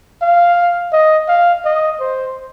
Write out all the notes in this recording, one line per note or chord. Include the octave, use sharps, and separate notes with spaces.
F5
D#5
F5
D#5
C5